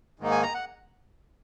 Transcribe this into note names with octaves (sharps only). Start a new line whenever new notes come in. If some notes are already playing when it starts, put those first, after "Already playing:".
G#2 D#3 A#3 D#4
G#5
A#5
F#5